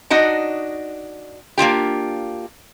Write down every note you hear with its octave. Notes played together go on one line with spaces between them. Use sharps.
D4 D#4 F#4 D#5
A#3 D4 F4 G4